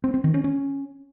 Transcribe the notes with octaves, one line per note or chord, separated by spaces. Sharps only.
C4
C4
D#3
C#4
C#4